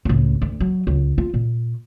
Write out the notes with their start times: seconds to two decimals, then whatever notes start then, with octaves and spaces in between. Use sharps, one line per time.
0.05 C#2 A2
0.42 D2
0.60 F#3
0.87 C#2
1.18 F4
1.34 A#2